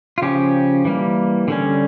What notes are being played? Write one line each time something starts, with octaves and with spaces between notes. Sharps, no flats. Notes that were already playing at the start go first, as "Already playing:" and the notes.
F4
C#3 F3 C#4 G4
E3 G3 A#3
D3 G3 C#4